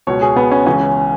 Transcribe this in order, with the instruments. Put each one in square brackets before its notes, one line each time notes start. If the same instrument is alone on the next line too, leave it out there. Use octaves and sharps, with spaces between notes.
[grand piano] C#2 B2 C#5
G#4
B3
C#4
C#2 C#3 E3 C#4